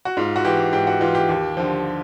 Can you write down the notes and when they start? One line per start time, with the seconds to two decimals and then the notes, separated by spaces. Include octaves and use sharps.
0.05 F#4
0.17 G#2 F4
0.36 F#4
0.45 E3 G4
0.73 G#2 G4
0.87 F#4
1.01 E3 F4
1.15 G4
1.29 D#2
1.57 D3 F3